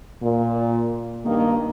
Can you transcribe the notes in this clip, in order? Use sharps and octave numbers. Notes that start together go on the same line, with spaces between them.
A#2
G2 D#3 A#3